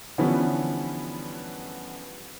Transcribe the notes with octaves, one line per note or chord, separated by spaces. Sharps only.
D3 E3 F3 G3 B3 C#4